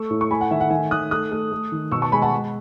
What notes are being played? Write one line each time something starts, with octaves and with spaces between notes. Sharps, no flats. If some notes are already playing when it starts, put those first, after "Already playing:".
Already playing: A3 C#6 E6
A2
C#6
A3 G#5 B5
F#5
D#3 E5 G#5
F#5
D#3 E5 G#5
D#3 D#6 F#6
A3 D#6 F#6
A3
A3
D#3
B2 C#6 E6
A5 C#6
G#3 G#5 B5
F#5 A5
G#3